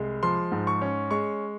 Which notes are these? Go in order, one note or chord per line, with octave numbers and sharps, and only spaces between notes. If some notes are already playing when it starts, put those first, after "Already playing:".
Already playing: C2 G#3
F3 C6
G#2
C#6
C#4
G#3 C#6